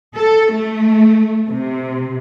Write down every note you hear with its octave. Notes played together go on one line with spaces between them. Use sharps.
A4
A3
C3